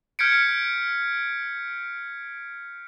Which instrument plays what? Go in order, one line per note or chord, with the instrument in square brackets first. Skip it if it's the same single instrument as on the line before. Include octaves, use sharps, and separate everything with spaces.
[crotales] F6 G6 G#6 B6 C#7 D7